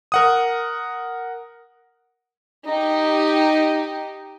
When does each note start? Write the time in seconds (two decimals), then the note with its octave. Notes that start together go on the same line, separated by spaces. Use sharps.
0.12 A#4 F#5 D#6
2.67 D#4 G4